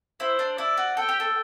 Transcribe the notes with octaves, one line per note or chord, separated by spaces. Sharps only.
E4 C5
D4
E4 D5
F#4
A4 G5
G4
A4